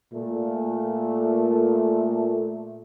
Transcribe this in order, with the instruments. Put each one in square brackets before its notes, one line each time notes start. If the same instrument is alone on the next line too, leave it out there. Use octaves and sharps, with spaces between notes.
[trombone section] A#2 A3